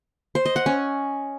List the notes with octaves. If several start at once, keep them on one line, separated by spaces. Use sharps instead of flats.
C5
D#5
F#5
C#4